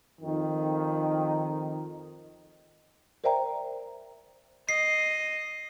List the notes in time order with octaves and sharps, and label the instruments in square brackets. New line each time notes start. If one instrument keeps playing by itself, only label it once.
[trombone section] F2 D#3
[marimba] A#4 C5 D5 E5 G5 A#5
[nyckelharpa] D#5 [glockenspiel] C7